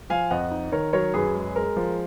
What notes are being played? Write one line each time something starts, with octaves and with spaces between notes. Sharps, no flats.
F3 F5 G#5
F2 D#5 F#5
D#4
D#3 A#4 C#5
F#3 A#4 C#5
F#2 G#4 B4
G#3
G#3 A#4
F3